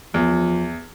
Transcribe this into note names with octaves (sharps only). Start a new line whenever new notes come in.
E2 F3